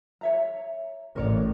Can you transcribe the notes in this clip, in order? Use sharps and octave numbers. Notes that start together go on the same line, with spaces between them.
C#5 E5 A#5
A1 A#4 C#5 D5